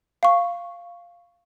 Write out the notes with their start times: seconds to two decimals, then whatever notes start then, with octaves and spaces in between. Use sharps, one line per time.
0.23 F5 C#6